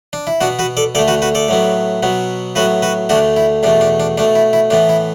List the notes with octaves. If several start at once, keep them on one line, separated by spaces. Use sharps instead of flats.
D4
E4
B2 B3 D4 F#4
F#4 B4
A4 D5
D2 D3 A3 A4 D5
F#4 B4
F#4 B4
A4 D5
A2 F#3 B3
B2 F#3 B3
A2 F#3 B3 F#4 B4
F#4 B4
D2 D3 A3 D4 F#4
E4
E2 B2 A3 D4
D4
D4
B2 A3 D4
E4
E4
A2 E3 B3 D4
E4